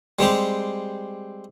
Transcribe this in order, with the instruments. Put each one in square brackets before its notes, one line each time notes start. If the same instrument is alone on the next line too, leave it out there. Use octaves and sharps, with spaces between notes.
[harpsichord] G3 G#3 C4 G4